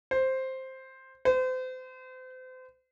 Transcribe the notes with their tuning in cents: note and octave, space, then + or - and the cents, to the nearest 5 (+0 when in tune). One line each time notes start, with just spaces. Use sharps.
C5 +5
C5 -35